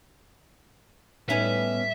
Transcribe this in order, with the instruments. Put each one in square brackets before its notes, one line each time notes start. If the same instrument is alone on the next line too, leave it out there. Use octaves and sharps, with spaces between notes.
[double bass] A2 G3 [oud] B3 C#4 D#4 [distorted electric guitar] E5